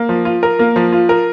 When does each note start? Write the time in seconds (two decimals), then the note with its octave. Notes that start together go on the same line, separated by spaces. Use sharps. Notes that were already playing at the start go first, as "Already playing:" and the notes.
Already playing: A#3
0.09 F3
0.25 F4
0.43 A#4
0.59 A#3
0.76 F3
0.92 F4
1.09 A#4